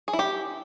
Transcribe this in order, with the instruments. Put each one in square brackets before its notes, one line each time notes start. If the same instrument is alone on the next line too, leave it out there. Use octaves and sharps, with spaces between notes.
[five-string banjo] G#4
E4
G4